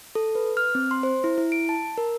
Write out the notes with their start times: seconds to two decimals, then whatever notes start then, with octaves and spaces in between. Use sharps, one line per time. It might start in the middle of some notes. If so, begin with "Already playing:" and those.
0.15 A4
0.35 B4
0.57 F6
0.75 C4
0.91 C6
1.03 C5
1.24 E4
1.38 E4
1.52 D7
1.69 A5
1.98 A#4